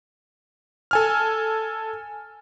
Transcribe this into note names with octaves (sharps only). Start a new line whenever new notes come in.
A4 G#5 F6